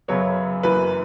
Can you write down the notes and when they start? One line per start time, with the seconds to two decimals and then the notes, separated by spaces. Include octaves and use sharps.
0.08 F#2 C#3 F#3 B3 C#5
0.63 F#1 F#2 E3 B4